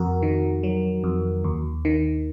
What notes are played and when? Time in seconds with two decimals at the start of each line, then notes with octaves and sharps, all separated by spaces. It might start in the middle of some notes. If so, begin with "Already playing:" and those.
Already playing: F2 F#4 A#4
0.23 D#3
0.63 F#3
1.04 F2
1.44 D#2
1.85 D#3